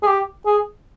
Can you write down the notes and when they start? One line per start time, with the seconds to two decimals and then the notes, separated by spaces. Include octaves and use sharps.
0.03 G#4
0.07 G4
0.46 G#4